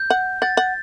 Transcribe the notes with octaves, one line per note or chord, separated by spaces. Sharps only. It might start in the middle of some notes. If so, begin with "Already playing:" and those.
Already playing: G6
F#5
F#5 A6
F#5